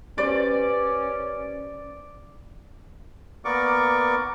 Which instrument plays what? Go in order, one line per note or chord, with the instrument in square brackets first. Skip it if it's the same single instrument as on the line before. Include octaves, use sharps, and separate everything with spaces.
[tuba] C#4 [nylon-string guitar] G4 B4 C5 [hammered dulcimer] D5
[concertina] A#3 B3 A#4 D5 C#6 D6